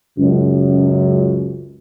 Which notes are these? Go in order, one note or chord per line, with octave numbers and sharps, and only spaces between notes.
C#2 F#2